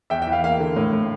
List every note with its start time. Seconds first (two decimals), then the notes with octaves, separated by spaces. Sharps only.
0.10 E2 E5 G5
0.22 E5 G5
0.27 E3
0.32 F5
0.44 A#3 F5
0.60 D3
0.76 A2
0.93 A2